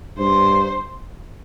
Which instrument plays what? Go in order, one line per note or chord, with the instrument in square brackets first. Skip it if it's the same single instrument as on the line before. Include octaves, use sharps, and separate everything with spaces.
[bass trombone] G2 [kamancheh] C5